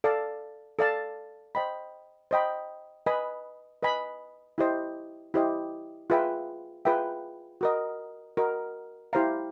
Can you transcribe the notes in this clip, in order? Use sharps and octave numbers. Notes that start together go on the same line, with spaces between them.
A4 D5 F5 A5
A4 D5 F5 A5
C5 D#5 G5 B5
C5 D#5 G5 B5
B4 D#5 G#5 B5
B4 D#5 G#5 B5
E4 G4 C5 D#5
E4 G4 C5 D#5
F4 G#4 B4 E5 G5
F4 G#4 B4 E5 G5
F#4 A#4 D#5
F#4 A#4 D#5
E4 G4 C5 F5 A#5